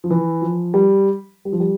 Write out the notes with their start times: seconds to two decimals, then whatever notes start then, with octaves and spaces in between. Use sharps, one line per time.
0.04 F3
0.10 E3
0.42 F3
0.74 G3
1.45 G3
1.53 F3
1.60 G3